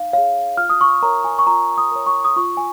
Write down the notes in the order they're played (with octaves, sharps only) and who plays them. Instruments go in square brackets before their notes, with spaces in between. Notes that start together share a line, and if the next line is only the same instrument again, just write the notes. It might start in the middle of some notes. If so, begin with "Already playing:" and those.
Already playing: [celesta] D#4 F5
G#4 C#5 F5
F4 F6
D#6
C#6
A#4 C#5 A#5
G#5
C#6
F4 A#5
D#6
A#4 C#5
C#6
D#6
F4 C#6
G#5